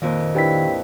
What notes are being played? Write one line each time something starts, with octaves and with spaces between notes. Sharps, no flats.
F2 A#2 D#3 D#5
D4 E4 G4 B4 G5 B6